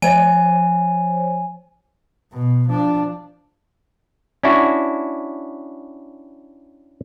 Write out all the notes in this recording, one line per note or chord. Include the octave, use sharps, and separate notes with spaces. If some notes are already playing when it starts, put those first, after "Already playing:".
F3 C5 C#5 G#5 D#7
B2
F3 D4
C#4 D4 E4 F#4